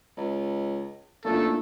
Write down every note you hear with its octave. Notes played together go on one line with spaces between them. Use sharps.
C#2
F#1 A3 A#3 D4 F4 A4